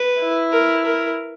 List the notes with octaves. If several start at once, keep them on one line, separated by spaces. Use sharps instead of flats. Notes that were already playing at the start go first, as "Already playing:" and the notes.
Already playing: B4
E4
A#4
A#4